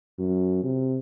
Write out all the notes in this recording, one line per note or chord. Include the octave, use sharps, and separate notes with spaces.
F#2
C3